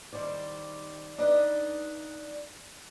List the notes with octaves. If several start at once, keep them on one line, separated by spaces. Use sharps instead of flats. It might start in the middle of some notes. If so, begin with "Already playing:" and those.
D#3 G3 C5 D5
D4 D#4 B4 D5 D#5